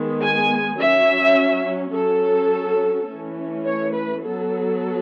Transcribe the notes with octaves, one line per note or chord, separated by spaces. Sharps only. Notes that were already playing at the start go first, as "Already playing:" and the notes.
Already playing: D#3 G#3 B3
G#5
F#3 C#4 E5
F#3 C#4 A4
E3 A3 C#4
C#5
B4
F#3 B3 A4